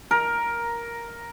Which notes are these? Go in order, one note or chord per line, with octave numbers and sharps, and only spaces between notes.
A#4